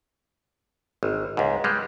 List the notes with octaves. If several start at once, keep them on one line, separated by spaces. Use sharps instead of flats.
G#1
C#2 G#2
G3 G#3